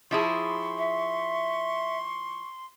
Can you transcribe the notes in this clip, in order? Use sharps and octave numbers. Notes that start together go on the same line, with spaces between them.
F3 E4 G#4 C6 C#6
E5